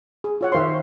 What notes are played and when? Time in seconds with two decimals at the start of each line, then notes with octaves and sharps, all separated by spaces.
0.24 G#4
0.41 F4 C#5 F#5
0.52 D#3 C5 E5 F5 C6